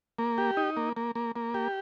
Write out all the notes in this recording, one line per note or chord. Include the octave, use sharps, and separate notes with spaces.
A#3
G4
D#4
A#3
A#3
A#3
A#3
G4